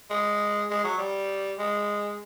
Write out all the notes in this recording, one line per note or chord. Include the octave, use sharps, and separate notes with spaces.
G#3
G#3
F#3
G3
G#3